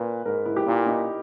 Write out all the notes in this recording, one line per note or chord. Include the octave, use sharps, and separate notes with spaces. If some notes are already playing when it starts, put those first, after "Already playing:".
Already playing: A#2 B4
G#2 A#4
E4
G4
A#2 E4
D#4